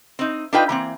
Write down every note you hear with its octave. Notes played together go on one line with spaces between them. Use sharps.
C4 D#4
D4 D#4 F4 B4 D#5 G5
E3 A#3 C4